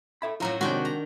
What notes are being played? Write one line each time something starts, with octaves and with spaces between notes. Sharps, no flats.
A4 E5 B5
F#2 A2 F#3 F4 A#5
C3 D#3 E3 G#3 D4 F#4 G5
A#5